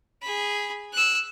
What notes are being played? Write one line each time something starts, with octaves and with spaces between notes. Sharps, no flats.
G#4 B5
E6 F#6